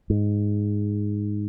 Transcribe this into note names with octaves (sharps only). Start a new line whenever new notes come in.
G#2